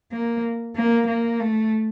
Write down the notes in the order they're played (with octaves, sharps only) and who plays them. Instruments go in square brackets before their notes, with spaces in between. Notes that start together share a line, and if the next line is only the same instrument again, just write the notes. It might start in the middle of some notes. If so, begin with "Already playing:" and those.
[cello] A#3
A#3
A#3
A3